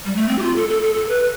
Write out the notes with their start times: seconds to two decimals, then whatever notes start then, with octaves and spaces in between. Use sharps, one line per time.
0.05 G3
0.16 A3
0.29 C4
0.39 G4
0.43 F4
0.56 A4
0.69 A4
0.83 A4
0.95 A4
1.09 B4